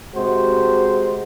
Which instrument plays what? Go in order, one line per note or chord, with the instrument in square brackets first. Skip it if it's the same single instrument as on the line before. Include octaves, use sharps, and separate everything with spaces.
[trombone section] C3 G#3 F#4 C5